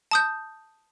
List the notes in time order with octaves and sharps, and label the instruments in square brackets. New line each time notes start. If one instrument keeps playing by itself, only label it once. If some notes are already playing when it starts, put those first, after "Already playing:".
[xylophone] A5 D#6 G6